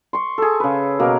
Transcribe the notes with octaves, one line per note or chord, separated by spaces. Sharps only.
C6 C#6
G#4 A4
C#3 B4
B2 A#3 A#4